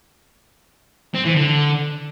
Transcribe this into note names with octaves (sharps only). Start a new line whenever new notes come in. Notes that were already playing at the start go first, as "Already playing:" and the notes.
C4
E3
D3